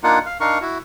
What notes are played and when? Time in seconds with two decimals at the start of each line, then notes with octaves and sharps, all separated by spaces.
0.04 A#3 D4 D#4 F4 F#5
0.26 F5
0.40 D4 D#4 A#4 F5 C#6
0.61 E4 F#4